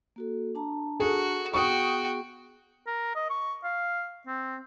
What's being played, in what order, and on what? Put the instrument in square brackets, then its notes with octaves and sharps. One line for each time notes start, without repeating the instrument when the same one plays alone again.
[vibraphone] A#3 F#4 A4
D4 A5 A#5
[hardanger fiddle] F#4 [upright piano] G#4 A4
[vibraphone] B3 G#4 [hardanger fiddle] F#4 G5 [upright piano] C#6 D#6
[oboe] A#4
D#5
C#6
F5
C4